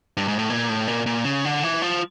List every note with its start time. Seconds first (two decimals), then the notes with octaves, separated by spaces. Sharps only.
0.17 G2
0.28 G#2
0.39 A2
0.50 A#2
0.69 A2
0.88 A#2
1.06 A#2
1.25 C#3
1.45 D3
1.63 E3
1.82 F3